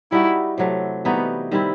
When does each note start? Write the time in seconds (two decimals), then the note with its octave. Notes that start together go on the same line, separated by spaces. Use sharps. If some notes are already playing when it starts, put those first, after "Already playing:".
0.12 G3 D#4 E4 F#4
0.58 C3 F#3 A3
1.05 E3 G3 B3 D#4 F#4
1.51 D#3 G3 C4 E4